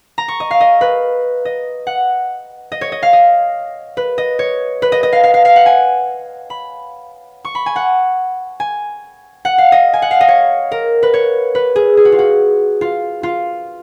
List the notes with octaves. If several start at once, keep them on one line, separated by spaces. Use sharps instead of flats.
A#5
C#6
D#5
F5
D#5
B4
D#5
F#5
D#5
C#5
D#5
F5
D#5
B4
D#5
C#5
B4
D#5
D#5
F5
F5
F5
F5
F#5
G#5
B5
C#6
B5
G#5
F#5
G#5
F#5
F5
D#5
G#5
F#5
F5
D#5
C#5
A#4
B4
C#5
B4
G#4
G#4
F#4
F4
F#4
F4
F4